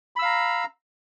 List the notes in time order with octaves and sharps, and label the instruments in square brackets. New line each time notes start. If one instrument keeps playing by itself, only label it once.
[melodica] B5
E6
F5
A#5